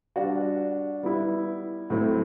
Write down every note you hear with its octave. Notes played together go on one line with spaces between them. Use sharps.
G3 D4 F#4
G3 B3 E4
A2 F#3 A3 C4 E4